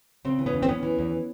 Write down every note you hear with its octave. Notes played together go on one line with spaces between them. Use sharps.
C#3 C4
E3
B3 C#4
E2
C4
E2 B3 C#4
E3
E2